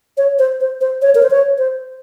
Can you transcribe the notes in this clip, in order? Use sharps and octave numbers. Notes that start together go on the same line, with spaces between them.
C#5
C5
C5
C5
C#5
A#4
C5
C#5
C5